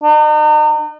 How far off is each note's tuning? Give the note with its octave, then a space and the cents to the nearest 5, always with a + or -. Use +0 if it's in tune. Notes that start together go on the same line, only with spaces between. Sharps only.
D#4 -40